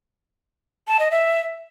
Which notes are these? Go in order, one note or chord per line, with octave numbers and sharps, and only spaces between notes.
A5
D#5
E5